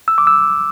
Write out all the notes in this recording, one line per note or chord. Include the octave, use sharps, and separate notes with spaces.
E6
D6
E6